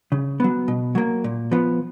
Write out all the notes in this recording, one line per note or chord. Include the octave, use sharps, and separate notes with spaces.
C#3
F#3 B3
B2
F#3 A#3
A#2
F3 B3